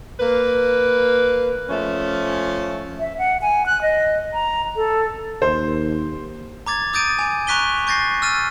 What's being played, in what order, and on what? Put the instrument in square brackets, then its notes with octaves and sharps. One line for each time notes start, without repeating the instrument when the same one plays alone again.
[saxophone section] A#3 B4
F3 A3 C#4
[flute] E5
F#5
G#5
F#6
D#5
A#5
A4
[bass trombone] D#2 [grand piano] C5
[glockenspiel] A#5 D6 G#6 A6
D6 D#6 G6 A6 D7 D#7
G#5
A#5 C#6 F#6 B6 D#7 G7
C#6 G6 A6 A#6 C7
E6 F6 A6 D#7